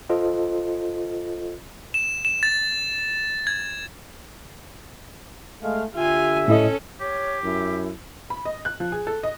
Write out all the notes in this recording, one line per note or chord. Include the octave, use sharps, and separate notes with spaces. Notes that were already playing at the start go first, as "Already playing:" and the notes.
F4 A4 C5 D#5
E7
E7
A6
G#6
G#3 A3 F5
D3 F4 G4 E5 G#5
A2 C#4 E4 A4 D#5
G4 C#5
F#2 E4
B5
D#5
F#6
F3
G#4
A4
D#5